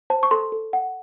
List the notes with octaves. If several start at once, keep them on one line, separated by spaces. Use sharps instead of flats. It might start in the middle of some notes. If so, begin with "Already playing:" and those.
C5 A5
C#6
A4 C6
A4
F#5